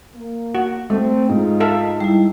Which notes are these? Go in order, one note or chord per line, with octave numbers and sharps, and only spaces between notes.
A#3
F#4
A3 C4
G#2 D#4 F4
A4 E5 F5
G3 E4